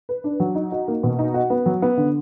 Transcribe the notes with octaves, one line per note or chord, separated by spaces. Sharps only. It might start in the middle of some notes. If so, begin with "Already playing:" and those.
B4
D4
F#3
D#4
F#4
A#3
B2
D#4
F#4
B3
F#3
B3
D3